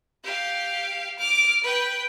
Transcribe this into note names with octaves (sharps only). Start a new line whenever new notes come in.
G4 F5
D6 F6
B4 G5